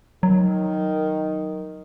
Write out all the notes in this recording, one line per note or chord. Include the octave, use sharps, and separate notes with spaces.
D#3 F#3